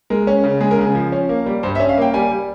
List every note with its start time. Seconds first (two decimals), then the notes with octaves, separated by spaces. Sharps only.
0.10 G#3 A#4
0.27 C#4
0.44 C#3
0.61 G#3 G#4
0.71 A#4
0.78 C#3 G#4
0.95 F3
1.12 C#4
1.29 A#3
1.46 G3
1.63 G2 C5
1.75 E5
1.80 C#4
1.89 F5
1.98 A#3 G5
2.14 G3 G#5
2.31 G3